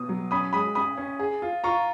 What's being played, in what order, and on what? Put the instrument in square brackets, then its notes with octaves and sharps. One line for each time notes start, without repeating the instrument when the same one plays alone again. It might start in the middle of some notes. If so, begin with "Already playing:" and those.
Already playing: [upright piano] B2 [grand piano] D#6
[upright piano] F#3
[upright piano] C#4 [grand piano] B5 D#6
[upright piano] G#3 [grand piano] B5 D#6
[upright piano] C#4 [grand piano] B5 D#6
[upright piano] C#4
G#4
F4
[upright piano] F4 [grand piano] A#5 C#6